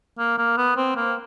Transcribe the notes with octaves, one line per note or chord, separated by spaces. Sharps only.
A#3
A#3
B3
C4
A#3